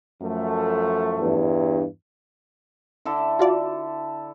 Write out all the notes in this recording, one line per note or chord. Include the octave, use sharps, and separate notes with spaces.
F#2 F3 A3
E2 G2
D3 E4 A4
F4 F#4 D5